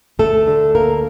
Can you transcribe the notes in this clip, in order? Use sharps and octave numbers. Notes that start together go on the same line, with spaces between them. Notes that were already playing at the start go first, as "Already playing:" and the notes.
D2 A3 A4
D3
D2 A#3 A#4